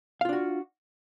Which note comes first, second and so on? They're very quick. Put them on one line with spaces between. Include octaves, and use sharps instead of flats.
F5 F4 D4 F#4